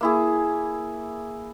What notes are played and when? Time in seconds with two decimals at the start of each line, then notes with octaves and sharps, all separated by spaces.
0.01 A#3 E4 G#4